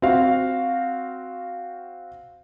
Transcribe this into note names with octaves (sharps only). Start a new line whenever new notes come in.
C4 F#4 F5